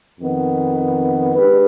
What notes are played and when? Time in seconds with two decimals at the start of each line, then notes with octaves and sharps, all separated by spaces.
0.20 F2 D#3 B3
1.35 G#3 D4 G4 B4